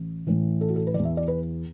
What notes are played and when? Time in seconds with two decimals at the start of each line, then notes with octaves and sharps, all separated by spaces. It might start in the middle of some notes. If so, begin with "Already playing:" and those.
Already playing: A1
0.27 A1 A2 E3
0.61 A4
0.68 F#4
0.76 A4
0.87 B4
0.94 E3 D5
0.99 E2
1.05 E5
1.17 D5
1.28 B4